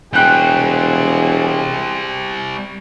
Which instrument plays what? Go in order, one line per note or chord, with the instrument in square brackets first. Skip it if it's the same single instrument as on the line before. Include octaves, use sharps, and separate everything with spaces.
[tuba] E1 [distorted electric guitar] G3 C4 [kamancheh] G#4 [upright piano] G5 F#6 G6